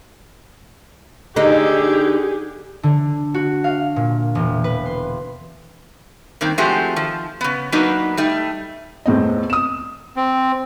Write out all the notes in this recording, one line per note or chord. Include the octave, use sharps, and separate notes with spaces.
D3 D#4 G4 G#4
D3
F#4
F5
A#2
E1
B4
C6
G2 D#3 A#3 C4
F3 G#3 A3 C4 F#4 G4
D#3 F3
C#3 B3
F#3 A#3 B3 D4 D#4 B4
G3 A3 D#4
E2 A2 C4 D#5
D#6 E7
C4